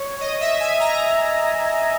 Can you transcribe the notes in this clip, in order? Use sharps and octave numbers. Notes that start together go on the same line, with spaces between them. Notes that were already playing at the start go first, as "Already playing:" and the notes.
Already playing: C#5
D#5
E5
G#5
A#5